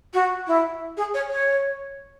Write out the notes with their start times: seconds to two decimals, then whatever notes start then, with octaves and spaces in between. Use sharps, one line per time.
0.14 F#4
0.47 E4
0.97 G#4
1.14 C#5
1.31 C#5